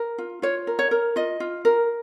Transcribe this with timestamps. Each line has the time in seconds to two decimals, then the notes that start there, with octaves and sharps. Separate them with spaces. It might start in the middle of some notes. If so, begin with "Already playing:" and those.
Already playing: A#4
0.18 F4
0.42 F4 C#5
0.67 A#4
0.79 C#5
0.91 A#4
1.16 F4 D#5
1.40 F4
1.65 A#4